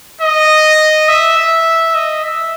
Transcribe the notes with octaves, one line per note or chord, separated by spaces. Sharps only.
D#5
E5
E5
D#5
E5